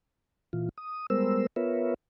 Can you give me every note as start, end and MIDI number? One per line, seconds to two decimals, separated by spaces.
0.53 0.69 46
0.53 0.69 52
0.53 0.69 65
0.78 1.06 87
1.10 1.47 55
1.10 1.47 56
1.10 1.47 59
1.10 1.47 70
1.10 1.47 72
1.10 1.47 88
1.56 1.94 59
1.56 1.94 65
1.56 1.94 70
1.56 1.94 71
1.56 1.94 73
1.56 1.94 76